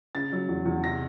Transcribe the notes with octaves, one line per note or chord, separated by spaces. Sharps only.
C#3 A6
F#3
E2
E2
C3 A#6